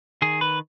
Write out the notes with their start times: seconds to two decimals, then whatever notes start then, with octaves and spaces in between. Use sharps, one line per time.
0.22 D#3 G#4
0.41 B4